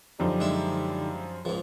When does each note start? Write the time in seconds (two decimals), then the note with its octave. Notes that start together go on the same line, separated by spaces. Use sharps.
0.20 F#2 D3 F3 G3 D#4
0.40 G#3 D4 E5
1.45 C#2 G#2 F3